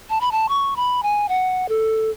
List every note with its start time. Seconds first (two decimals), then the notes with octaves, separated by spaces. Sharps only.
0.10 A5
0.21 B5
0.32 A5
0.49 C#6
0.76 B5
1.03 G#5
1.29 F#5
1.69 A4